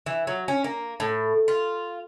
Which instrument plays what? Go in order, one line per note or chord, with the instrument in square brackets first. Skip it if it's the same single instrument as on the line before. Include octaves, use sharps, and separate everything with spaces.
[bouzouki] E3
F#3
C#4
A#3
A2
F4